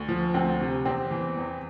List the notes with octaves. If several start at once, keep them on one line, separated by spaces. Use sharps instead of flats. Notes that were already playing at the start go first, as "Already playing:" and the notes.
Already playing: D2
F3
D2 C4
C3
E2 C4
E3
E2